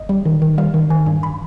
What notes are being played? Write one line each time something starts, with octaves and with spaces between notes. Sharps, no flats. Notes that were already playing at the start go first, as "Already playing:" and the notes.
Already playing: G1 D#5
G3
D#3
D#3
G3 F5
D#3
D#3 G#5
G2
B5